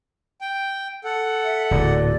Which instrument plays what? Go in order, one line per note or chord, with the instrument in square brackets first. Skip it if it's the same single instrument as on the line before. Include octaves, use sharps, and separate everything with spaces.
[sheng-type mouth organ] G5
A4 F#5
[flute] E5
[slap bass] D1 A#2 [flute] D5